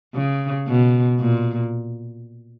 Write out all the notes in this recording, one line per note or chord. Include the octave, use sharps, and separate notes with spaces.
C#3
B2
A#2